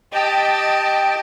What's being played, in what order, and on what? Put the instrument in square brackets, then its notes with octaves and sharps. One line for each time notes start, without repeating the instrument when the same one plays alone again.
[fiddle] G4 [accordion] D#5 G5 A5